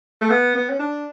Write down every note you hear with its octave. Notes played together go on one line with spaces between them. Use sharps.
A3
B3
B3
C#4
D4